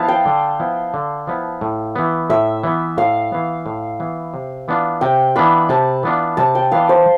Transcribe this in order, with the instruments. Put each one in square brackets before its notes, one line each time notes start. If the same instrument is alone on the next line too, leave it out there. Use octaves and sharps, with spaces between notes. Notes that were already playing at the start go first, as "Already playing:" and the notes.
Already playing: [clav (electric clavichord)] F3 B3 E4 [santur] F5 A5
[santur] G5
[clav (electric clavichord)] D3
F3 B3 E4
D3
F3 B3 E4
A2
E3 B3
[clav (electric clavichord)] A2 [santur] E5
[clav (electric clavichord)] E3 B3
[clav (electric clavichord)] A2 [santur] F5
[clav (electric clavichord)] E3 B3
A2
E3 B3
C3
E3 B3 D4 F4
[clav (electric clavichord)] C3 [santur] G5
[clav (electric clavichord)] E3 B3 D4 F4 [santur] B5
[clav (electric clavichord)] C3 [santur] A5
[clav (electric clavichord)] E3 B3 D4 F4
[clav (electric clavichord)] C3 [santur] A5
[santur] G5
[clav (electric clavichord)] E3 B3 D4 F4 [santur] F5
[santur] C5